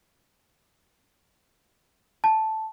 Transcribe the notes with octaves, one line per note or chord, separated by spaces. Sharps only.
A5